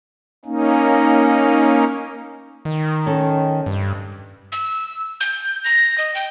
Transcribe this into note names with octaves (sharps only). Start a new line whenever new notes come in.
A#3 C#4 D#4
D#3
C#4 A4
G2
E6
G6
A#6
D#5
G5